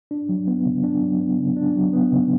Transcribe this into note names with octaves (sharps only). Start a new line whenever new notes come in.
D4
F#3
B3
C#3
D4
F#3
B3
C#3
D4
F#3
B3
C#3